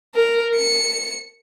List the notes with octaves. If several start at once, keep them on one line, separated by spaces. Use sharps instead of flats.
A#4
C#7